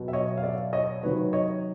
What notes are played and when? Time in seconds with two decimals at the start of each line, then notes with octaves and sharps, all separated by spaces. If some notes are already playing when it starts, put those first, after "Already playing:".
Already playing: B2 F#3
0.08 E5
0.13 C#5 D#5
0.37 F5
0.43 D5 E5
0.73 C#5 D#5
1.03 C3 D#3 F#3 B4 C#5
1.33 C#5 D#5